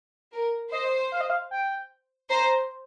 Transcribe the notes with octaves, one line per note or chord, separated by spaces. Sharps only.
A#4
C5 D#5
F5
D#5
F5
G5
C5 A#5